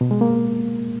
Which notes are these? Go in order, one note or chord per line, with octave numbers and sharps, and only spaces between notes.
B2
G#3
A#3